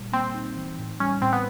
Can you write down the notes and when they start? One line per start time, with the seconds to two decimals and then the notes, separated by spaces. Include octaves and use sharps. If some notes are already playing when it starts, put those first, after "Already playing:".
Already playing: A#2 G3
0.13 A#3 C4
0.34 D#4
0.56 E3
0.78 A2
1.00 G3 C#4
1.22 A2 C4
1.33 B3